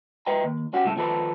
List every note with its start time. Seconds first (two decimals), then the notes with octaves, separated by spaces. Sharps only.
0.26 B4 D#5 G5 A#5
0.44 D#2
0.73 C#4 F#4 G4
0.85 C2 A2 C#3 A4
0.97 D#3 F3 A4 B4